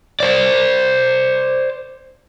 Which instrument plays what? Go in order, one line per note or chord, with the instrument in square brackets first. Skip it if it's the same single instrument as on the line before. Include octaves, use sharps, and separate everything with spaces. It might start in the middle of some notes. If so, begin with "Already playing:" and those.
[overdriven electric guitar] C5 D5